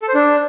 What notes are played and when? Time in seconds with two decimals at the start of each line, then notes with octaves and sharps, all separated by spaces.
0.02 A4
0.08 C5
0.14 D4